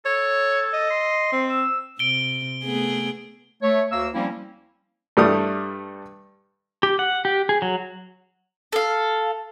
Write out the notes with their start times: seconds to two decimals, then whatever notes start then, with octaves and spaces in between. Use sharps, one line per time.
0.06 A4 C#5
0.73 D#5
0.90 C6
1.32 C4
1.50 E6
1.99 C3 D7 G7
2.64 A3 B3 G#4
3.62 A3 C#5
3.92 D2 A#3 C#5 E6
4.14 F3 G3 A#3 C4 C#4 E4
5.17 G2 G3 A3 D#6
6.83 G4
6.99 F#5
7.25 G4
7.49 G#4
7.62 F#3
8.73 A4 F5